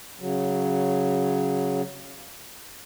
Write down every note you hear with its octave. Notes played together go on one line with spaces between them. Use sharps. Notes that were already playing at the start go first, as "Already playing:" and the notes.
C#3 F#3